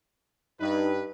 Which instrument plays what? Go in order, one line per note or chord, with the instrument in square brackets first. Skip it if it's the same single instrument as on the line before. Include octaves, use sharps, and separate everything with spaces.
[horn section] G2 B4 [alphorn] D#4